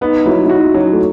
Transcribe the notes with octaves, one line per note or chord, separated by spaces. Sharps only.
B3 D#4
F#3 E4
E4
D#4 F#4
F#3 C#4
A3